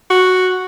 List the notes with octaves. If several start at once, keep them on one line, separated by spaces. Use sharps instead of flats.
F#4